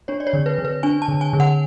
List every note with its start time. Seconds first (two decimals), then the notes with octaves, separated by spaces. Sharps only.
0.08 D4 C#5
0.20 D5
0.27 C#5
0.33 D3
0.46 B4
0.58 D3
0.65 B4
0.83 D4 G#5
1.02 A5
1.08 D3
1.21 G#5
1.33 D3
1.40 F#5